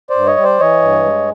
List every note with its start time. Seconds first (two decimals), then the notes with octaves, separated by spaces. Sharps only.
0.10 C5 D5
0.15 G2
0.27 C#5 D#5
0.37 G3
0.43 C5 D5
0.60 E3 C#5 D#5
0.82 G2
1.04 G#3